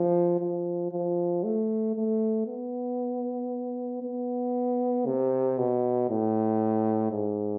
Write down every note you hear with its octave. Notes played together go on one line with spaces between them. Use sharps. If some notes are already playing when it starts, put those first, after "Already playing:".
Already playing: F3
F3
F3
A3
A3
B3
B3
C3
B2
A2
G#2